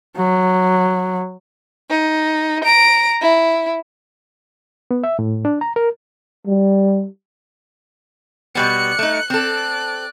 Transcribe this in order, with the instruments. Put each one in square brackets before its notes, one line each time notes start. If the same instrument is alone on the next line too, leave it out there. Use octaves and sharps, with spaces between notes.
[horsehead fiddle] F#3
[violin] D#4
A#5 D7
E4
[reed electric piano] B3
E5
A2
D4
A#5
A#4
[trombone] G3
[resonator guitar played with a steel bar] B2 G3 B3 [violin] F#6 C#7
[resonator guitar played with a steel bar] A3 D#4
[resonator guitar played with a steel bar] C4 A4 [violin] D5 F#6